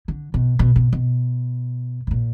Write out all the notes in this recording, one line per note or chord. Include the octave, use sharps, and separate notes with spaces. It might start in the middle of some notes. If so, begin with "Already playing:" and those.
D3
B2
B2
B2
B2
B2
A#2